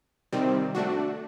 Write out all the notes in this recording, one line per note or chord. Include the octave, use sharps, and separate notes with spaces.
C3 D#3 G3 C4
A3 D4 F#4